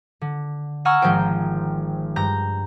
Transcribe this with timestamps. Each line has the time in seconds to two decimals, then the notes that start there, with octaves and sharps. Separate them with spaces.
0.21 D3
0.85 F#5 G#5 A#5 C#6 E6 F6
1.02 G#1 D#3 F3 D#4 C5 G5
2.16 G2 A#5 G6